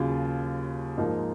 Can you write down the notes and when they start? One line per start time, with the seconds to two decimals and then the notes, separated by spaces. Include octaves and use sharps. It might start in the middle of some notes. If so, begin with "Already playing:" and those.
Already playing: D#2 C#3 F#3 F4
0.97 G#2 F3 A#3 D#4